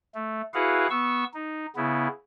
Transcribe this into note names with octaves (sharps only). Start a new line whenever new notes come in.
A3
E4 F#4 G#4 B4 F5 F#5
B3 C#6 E6
D#4
C#3 B3 E4